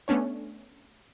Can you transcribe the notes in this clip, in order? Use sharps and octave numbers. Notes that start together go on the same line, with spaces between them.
A3 B3 C#4 D4 C#5